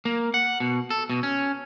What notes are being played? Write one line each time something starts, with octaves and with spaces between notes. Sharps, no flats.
A#3
F#5
B2
A4
B2
C#4